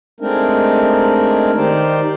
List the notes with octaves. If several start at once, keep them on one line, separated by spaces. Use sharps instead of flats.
G#3 A3 C4 D4 D#4 A#4
D#3 D#4 G4 C5 D5